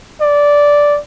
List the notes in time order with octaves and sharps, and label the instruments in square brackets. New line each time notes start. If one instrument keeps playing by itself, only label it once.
[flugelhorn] D5